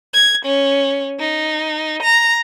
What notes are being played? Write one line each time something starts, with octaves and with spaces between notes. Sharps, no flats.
G#6
C#4
D#4
A#5